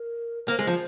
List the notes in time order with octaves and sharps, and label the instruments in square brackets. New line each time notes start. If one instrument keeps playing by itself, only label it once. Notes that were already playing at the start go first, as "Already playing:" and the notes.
Already playing: [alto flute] A#4
[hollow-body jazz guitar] A#3 [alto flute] C5
[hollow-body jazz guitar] G#3
F3